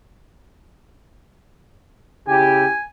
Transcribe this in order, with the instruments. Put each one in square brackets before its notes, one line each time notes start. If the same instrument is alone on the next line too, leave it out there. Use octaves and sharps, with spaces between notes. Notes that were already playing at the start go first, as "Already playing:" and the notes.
[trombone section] C#3 E4 G4 [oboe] G#5